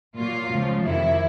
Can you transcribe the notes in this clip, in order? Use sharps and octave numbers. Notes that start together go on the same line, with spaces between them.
A#2 F#3 A#3 F4
C#2 C#3 F3
F2 C3 D#3 E4